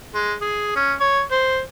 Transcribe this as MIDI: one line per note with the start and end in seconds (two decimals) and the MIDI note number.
0.15 0.35 56
0.41 0.72 68
0.76 0.94 61
1.00 1.21 73
1.31 1.61 72